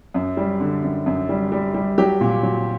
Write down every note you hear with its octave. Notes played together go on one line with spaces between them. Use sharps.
F#2
G3
D3
F#2
F#2
G3
G3
G3
F#3 G4
A#2
F#3